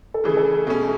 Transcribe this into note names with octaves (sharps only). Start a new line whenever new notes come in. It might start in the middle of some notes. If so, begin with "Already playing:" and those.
A4
C#3 E3 A3 G#4
A4
B2 A3 C#4 G#4